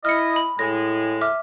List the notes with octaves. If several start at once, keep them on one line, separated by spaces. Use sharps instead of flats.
E4 D#5 F6 C#7
B5
A2 G#3 A#6
E5 D6 F6